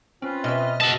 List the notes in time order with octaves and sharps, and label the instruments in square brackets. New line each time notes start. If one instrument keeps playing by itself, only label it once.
[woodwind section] C4 F4 B4 [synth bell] C#4
[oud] B2 E5 [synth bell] D#5 F6
[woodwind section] E2 D#6 E6 [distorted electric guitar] F#4 A5